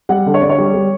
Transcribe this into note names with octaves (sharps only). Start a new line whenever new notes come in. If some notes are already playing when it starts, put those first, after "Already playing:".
G3 F#5
D3
C#5
D3 D5
C#5
G3
G3